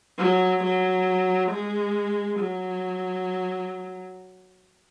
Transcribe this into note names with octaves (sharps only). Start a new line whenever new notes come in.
F#3
F#3
G#3
F#3